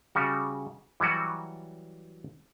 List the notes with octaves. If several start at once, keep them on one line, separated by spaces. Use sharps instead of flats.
C#3 G3 F#4
E3 F#3 G3 F#4